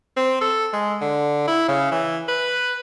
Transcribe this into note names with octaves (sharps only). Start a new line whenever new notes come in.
C4
A4
G#3
D3
E4
C#3
E3
B4